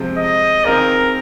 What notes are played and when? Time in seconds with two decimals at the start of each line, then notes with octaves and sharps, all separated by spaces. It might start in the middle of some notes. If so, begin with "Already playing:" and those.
Already playing: C3 F3 G#3 C4
0.17 D#5
0.64 D#3 C4 F4 G#4 A#4